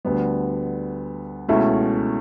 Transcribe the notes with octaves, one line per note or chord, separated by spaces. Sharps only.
D2 D3 G3 B3
C#2 B2 A3 C#4 E4